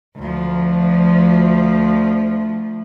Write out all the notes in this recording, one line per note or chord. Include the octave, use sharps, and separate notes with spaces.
D2 F3